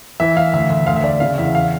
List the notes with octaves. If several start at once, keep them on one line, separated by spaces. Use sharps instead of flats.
E3 E5
E3 F5
D2 E5
D2
D2 F5
E5
D2 D5
E5
C#3 F5
E2 E5
F5